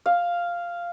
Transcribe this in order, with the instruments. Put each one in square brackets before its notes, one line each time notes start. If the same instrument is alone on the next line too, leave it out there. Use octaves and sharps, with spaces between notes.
[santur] F5